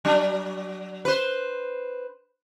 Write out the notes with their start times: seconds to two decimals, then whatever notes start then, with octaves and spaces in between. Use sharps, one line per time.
0.05 F#3 D4
1.05 B4 C5